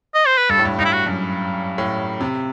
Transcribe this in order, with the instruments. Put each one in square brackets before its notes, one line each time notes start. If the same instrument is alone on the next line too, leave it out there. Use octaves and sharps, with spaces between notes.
[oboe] D#5
C5
B4
[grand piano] G2 [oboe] A4
[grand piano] A2
G2
[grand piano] G2 [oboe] D#4
[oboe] E4
F#4
[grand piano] F#2
A2
C3